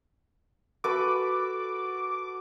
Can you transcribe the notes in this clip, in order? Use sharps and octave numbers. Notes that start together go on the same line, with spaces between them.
F#4 A4 B4 D6